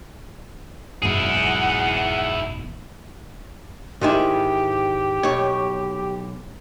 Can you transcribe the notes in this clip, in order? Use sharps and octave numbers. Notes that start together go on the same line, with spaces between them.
F#1 E2 G#2 B2 E4 G#4 F#5
G#2 D#3 E4 G4
B1 C#5